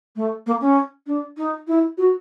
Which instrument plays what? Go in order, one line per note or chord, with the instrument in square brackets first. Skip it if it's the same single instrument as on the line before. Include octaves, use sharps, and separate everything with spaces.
[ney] A3
A#3
C#4
D4
D#4
E4
F#4